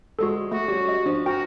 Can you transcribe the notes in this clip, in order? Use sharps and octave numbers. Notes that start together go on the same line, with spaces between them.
D2 G#3 F#4 A4
A3 F#4
G3 C#4 G4
D#5
F3 D4
F#4 A#4 G5